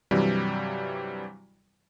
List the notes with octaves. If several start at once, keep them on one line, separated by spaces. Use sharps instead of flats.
G2 C3 E3 F#3 G3